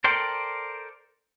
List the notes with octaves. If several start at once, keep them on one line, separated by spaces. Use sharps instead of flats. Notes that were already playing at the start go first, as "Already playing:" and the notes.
A4 A#4 C5 D5 G5